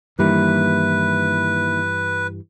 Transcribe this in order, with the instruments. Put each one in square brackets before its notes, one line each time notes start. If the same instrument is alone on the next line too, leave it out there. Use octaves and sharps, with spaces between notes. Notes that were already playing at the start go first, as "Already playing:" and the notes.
[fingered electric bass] G2 E3 G3 [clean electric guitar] D#3 A#3 E4 [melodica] B4